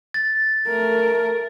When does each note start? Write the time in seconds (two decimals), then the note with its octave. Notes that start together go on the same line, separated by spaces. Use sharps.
0.14 A6
0.68 A3 A#4